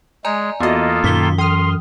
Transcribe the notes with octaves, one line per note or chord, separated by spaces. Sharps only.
G#3 D5 G#5 A#5
E2 A#3 B3 F4 F#4 A4 D#5
F#2 A#2 D#3 D#6 B6 G7
E3 C6 D#6 F6